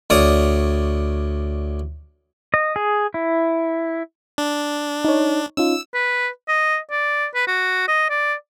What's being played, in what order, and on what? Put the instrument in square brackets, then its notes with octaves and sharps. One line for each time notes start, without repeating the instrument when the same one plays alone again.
[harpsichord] D2 C#5 D5 D#6
[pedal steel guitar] D#5
G#4
E4
[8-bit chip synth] D4
[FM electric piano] D#4 C#5
[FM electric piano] C#4 D#4 F4 [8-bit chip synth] E6
[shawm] B4
D#5
D5
B4
F#4
D#5
D5